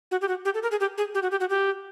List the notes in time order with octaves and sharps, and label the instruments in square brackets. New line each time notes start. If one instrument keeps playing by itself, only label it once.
[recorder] F#4
G4
F#4
G4
A4
A#4
G#4
G4
G#4
G4
F#4
G4
F#4
G4